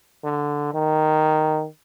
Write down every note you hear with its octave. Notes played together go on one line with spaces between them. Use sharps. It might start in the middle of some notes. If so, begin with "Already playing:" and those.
D3
D#3